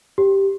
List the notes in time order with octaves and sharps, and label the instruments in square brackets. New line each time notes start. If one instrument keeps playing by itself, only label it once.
[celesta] G4